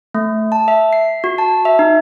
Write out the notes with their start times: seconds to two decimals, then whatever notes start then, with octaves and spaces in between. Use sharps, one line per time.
0.15 A3
0.52 A5
0.68 E5
0.93 C7
1.24 F#4
1.38 A5
1.65 E5
1.79 D#4